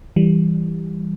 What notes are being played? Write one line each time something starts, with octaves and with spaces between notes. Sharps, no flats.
E3 G3